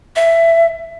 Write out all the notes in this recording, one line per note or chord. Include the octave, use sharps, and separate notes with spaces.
E5